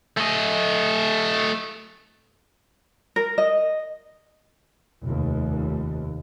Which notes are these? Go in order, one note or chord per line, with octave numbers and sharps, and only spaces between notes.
A3 D#5
A#4
D#5
F1 D#2